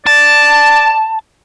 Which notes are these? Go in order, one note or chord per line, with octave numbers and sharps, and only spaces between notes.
D5 A5